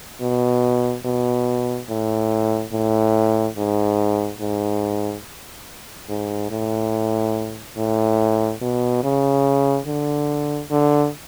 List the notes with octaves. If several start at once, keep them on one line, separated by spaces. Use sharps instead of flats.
B2
B2
A2
A2
G#2
G#2
G#2
A2
A2
B2
C#3
D3
D3